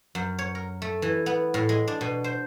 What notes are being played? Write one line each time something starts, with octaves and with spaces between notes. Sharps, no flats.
F#2
C#5
A#4
A3
E3
B3
A2
G#3
D4
B2
C5